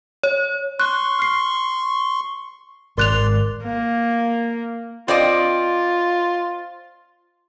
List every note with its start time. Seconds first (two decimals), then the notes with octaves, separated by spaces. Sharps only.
0.23 C#5
0.80 C6 C#6 F#6
1.19 F6 C7
2.98 G#1 A#4 D5 C6 F#6 F7
3.63 A#3
5.08 C4 F4 D5 D#5